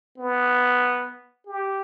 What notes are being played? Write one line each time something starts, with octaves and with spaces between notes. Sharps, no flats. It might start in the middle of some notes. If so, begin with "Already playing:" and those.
B3
G4